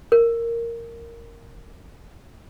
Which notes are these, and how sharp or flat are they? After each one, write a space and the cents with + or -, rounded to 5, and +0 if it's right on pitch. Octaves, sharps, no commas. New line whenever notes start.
A#4 -5